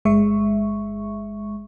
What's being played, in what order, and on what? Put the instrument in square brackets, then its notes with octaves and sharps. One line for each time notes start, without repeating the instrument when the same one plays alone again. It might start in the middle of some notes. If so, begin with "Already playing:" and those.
[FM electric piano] G1 G#3 E5 C#6